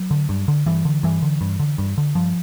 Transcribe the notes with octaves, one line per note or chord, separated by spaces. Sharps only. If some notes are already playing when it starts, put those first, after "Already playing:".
Already playing: F#3
D3
G2
D3
G2 E3
D3
G2 E3
D3
G2
D3
G2
D3
G2 F3